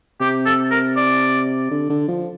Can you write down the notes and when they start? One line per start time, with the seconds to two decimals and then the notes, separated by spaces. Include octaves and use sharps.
0.21 C3 G4
0.46 A4
0.71 A#4
0.96 D5
1.71 D3
1.90 D3
2.08 F3